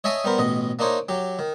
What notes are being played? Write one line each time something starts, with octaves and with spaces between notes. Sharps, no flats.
C#5 D#5 E5 G#5 A5 D#6
G3 B3 A#4 C5
A1 B2 D#5
A#3 D4 D#4 C5 C#5
F#3 G4
D#3